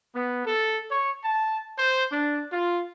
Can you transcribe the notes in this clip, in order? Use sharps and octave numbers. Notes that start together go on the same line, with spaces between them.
B3
A4
C#5
A5
C5
D4
F4